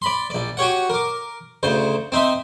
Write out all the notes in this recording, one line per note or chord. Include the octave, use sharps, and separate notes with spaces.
D5 B5 C6
A#1 D5
F#4 G4 C#5 F#5
A#4 D6
D2 C#3 C5
C4 D#4 E5 C6